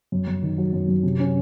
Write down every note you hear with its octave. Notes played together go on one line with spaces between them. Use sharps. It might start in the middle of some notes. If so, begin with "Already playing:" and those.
F#2
F#2
D#3
F#3
F#2
F#2
C3
C#4